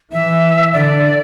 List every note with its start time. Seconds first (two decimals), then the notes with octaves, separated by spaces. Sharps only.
0.12 E3 E5
0.73 D3 D5